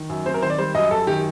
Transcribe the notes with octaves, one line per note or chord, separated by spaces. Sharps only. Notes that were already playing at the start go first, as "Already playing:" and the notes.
Already playing: D#3
F#2
C4 C5
A#4
D#3 C5
D5
G3 C5
F#2 D#5
F#2 A4
D#3 G4